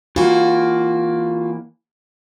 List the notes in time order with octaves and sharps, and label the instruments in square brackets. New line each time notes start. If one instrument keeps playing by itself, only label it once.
[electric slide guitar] E3 A#3 [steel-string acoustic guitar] F4 F#4